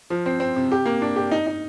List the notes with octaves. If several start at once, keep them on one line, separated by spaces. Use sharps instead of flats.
F3
C4
C4
C3
G4
A#3
D4
G4
D#4
D#4